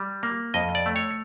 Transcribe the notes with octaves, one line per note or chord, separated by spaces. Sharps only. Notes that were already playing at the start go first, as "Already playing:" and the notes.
Already playing: G3
A#3
F2 D#5
D5
A3
C#5